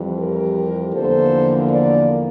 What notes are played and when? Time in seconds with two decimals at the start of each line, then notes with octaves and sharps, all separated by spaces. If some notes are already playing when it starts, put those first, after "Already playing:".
Already playing: F2 E3 G3
0.17 G4 A#4
0.93 E2 D3 F3 A#3 A4 C5
1.69 A#4 D5